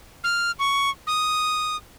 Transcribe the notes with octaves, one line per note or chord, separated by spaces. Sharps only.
F6
C#6
D#6